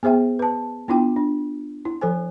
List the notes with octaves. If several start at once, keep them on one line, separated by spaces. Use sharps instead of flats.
B3 G#4 C5 E5 G5
B4 A5
B3 D4 E4 F4 G5
D4
E4
F3 A4 C5 G#5